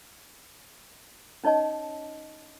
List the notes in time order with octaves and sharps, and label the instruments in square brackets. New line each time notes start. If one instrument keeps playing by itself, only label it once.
[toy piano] C#4 D#4 C#5 D#5 A5